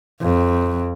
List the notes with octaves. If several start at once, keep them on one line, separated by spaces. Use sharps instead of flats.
F2